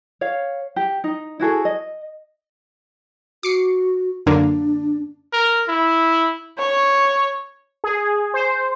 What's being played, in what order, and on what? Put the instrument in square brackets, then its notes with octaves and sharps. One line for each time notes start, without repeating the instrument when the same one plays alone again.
[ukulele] C#5 F5
G4
D#4
E4 F#4 G#4 A4
D#5
[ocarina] F#4 [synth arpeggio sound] D6 C7 C#7
[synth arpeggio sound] F#2 D3 A#3 [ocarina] D4
[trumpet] A#4
E4
[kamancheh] C#5
[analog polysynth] G#4
C5